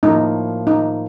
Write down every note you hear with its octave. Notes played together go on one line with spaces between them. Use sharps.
A2 F3 A#3 D#4
D#4